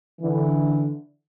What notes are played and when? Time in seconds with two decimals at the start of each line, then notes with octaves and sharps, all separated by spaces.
0.21 D3 E3